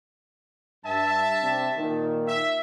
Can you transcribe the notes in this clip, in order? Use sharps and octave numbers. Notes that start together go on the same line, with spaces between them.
G2 E5 A5
C3 C4 D4
A#2 D#3
E5